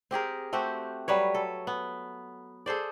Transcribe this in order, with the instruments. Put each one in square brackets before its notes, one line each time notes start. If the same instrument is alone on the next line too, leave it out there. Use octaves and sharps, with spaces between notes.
[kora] C4 G4 G#4 A#4
A3 C4 F#4 G4
F#3 G3 B4 C#5
A4
B3
G#4 A4 C5 D5